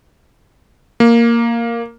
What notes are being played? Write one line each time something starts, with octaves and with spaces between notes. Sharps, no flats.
A#3